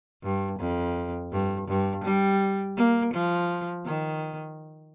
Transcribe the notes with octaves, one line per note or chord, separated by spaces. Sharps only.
G2
F2
G2
G2
G3
A#3
F3
D#3